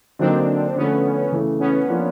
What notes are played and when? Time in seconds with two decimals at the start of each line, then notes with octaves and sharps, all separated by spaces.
0.19 D3 F#3 A#3 C4 D4 D#4
0.76 D3 F3 A3 B3 C#4
1.32 C#3 E3 A3
1.60 B3 C#4
1.88 F3 A#3 D4 F4